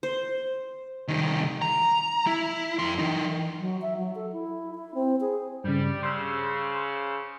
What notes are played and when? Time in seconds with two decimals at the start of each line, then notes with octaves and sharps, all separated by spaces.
0.03 C5
1.08 C2 D#3
1.62 A#5
2.27 E4
2.79 F2 C6
2.98 E3 D#4
3.59 F#3
3.82 E5
3.97 F#3
4.15 A4
4.32 E4
4.75 E4
4.95 C4
5.21 G#4
5.64 G2 C#3 G3
6.03 C#3 C5 C6 E6